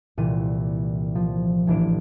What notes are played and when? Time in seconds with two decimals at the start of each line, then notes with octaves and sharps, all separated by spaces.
0.18 C2 A#2 E3 D#7
1.15 F3
1.67 A1 E3 D4 D7